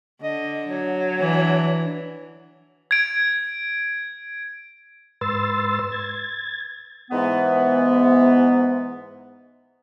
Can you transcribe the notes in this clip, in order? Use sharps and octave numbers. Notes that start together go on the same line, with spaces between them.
D3 D#5
F#3
E3 D4
G#6 D7
G#2 B4 C6 E6 A6
G#6 A6
G#2 E3 B3